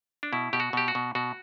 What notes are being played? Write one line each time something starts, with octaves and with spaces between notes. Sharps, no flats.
D4
B2 E4
B2 G4
F#4
B2 G4
F#4
B2
B2 F#4